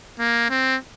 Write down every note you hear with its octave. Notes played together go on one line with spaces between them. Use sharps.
A#3
C4